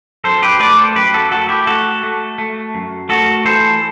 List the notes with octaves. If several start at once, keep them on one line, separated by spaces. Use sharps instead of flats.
F#2 A4 C5
G4 B4
A3 B4 D5
A4 C5
F#2 G4 B4
F#4 A4
A3 F#4 A4
E4 G4
A3 F#4 A4
A3
A3
F#2
A3 F#4 A4
E3 A4 C5